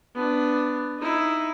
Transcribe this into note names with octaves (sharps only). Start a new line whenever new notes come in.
B3 D4
D#4 E4